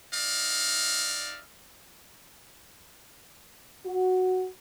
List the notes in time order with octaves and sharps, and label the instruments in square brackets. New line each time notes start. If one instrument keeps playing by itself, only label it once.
[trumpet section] D#4 D5 E5 F5
[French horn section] F#4